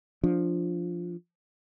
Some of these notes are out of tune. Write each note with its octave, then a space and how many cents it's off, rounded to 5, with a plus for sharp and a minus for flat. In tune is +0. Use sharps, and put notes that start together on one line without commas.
F3 +0 D4 +0